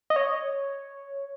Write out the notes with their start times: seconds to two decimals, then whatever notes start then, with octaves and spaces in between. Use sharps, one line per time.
0.10 D#5
0.16 C#5